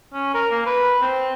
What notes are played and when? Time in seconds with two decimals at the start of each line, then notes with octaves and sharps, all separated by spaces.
0.14 C#4
0.34 A#4
0.51 A#3
0.66 B4
1.02 C4